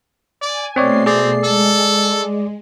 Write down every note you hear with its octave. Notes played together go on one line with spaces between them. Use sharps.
D5 G#5
B2 G#3 A3 C4 C#5 D5 C7
C4 G#4 D5
G#3 A4